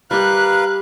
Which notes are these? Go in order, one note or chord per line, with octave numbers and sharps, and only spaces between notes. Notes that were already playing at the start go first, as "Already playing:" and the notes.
G3 G4 A#4 B4 F5 F#6